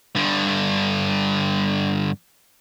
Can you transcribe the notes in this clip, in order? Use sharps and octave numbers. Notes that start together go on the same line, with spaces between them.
G2 D3